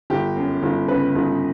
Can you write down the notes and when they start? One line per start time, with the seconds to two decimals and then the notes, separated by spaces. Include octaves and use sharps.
0.10 G1 G4
0.36 F#2
0.63 G1
0.88 C#3 B4
1.15 G1